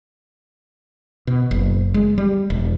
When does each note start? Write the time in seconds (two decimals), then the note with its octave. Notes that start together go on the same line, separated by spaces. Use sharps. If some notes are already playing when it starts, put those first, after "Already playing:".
1.27 B2
1.51 F#1
1.94 G#3
2.18 G3
2.50 E1